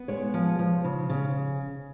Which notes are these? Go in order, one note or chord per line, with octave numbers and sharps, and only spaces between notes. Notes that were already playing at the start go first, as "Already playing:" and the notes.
Already playing: B3
G#3 C#5
F3
F3
C#3
C#3